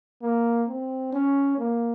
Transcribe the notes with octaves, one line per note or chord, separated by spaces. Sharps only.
A#3
C4
C#4
A#3